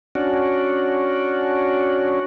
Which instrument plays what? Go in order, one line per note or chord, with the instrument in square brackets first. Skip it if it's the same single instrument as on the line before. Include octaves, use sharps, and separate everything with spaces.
[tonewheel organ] C#4 D4 F#4